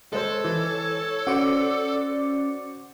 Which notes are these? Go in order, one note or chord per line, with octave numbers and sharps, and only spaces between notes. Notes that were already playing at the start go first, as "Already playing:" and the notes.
G#3 A4 C5 C#5
E3
C#4 F#4 C5 D5 D6 C#7